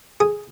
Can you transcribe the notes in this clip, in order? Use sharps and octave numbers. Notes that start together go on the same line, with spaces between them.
G#4